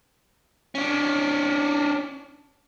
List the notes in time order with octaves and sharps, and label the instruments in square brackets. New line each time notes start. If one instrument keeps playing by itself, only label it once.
[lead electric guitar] C#4 D4